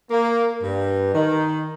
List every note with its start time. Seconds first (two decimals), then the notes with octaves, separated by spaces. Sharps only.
0.10 A#3
0.62 G2
1.13 D#3